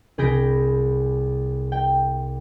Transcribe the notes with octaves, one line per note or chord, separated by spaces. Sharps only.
C2 G#4 B5 G6 A#6 D7
G5